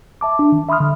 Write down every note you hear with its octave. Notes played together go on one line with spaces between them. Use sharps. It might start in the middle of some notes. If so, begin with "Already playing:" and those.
E5 A5 D6
D4
D#3
E5 B5 C6 D#6 F6
D3